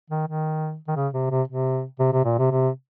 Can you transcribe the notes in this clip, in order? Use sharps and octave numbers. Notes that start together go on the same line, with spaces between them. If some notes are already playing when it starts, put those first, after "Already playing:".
D#3
D#3
D#3
C#3
C3
C3
C3
C3
C3
A#2
C3
C3